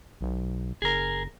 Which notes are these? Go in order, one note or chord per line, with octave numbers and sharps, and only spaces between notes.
B1
F#1 G#4 A#4